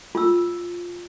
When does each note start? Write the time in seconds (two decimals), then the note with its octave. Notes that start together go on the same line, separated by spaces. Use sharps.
0.15 F4 E6